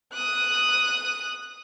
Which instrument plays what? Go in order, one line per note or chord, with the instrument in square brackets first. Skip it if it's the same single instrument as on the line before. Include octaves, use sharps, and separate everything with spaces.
[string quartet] D#6 F#6